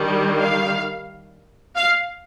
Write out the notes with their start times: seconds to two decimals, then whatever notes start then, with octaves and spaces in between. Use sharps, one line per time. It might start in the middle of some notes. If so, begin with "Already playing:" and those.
Already playing: D#3 G3 D4
0.40 F5
1.77 F5